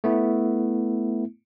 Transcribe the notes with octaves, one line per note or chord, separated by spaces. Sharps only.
A3 B3 E4